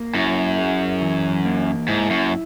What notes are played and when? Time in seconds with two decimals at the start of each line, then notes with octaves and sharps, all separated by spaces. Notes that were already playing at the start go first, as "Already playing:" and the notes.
Already playing: A#3
0.14 F#2 E4
0.58 G#4
1.02 E3
1.45 A#3
1.88 G#2 E4
2.10 F#2